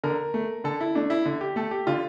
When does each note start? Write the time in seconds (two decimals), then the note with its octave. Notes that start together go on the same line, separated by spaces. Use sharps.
0.04 D3 A#4
0.34 A3
0.64 D3 A4
0.81 E4
0.95 A3 D4
1.10 E4
1.25 D3
1.41 G4
1.56 A3 A4
1.71 G4
1.87 D3 F4